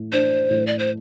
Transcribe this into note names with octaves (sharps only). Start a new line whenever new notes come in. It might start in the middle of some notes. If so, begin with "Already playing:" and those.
Already playing: A2
D4 C5
A2
D5
C5